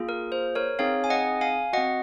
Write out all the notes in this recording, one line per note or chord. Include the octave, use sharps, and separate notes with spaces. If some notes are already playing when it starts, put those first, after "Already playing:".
Already playing: A#3 F4 G#4
A#4
C5
A#4 C#5
C4 D#4 G#4 C#5 F5
G#5
D#5 F#5
F5 G#5
C4 F#4 D#5 F#5